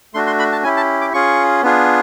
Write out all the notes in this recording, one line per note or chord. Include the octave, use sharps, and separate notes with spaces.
A3 D4 F#4 C6
C6
B5
A5
C#4 E4 G4 G#5
A5
D6
C#4 F4 G#4 C#6
B3 D4 F4 G#4